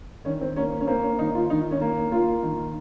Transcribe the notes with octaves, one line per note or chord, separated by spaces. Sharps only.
D#3 C#4
C4
A#3 C#4
C#4
A#3 C4
C#4
D#3 D#4
F4
D#3 D#4
C#4
A#3
A#3 F4
D#3